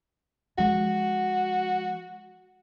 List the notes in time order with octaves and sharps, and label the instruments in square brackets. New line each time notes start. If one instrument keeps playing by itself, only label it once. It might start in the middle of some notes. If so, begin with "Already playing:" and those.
[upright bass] F3 G#3 [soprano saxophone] F#4